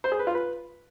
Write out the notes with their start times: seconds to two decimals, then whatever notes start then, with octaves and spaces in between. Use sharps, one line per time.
0.04 C5
0.12 G#4
0.19 B4
0.27 F4
0.35 B4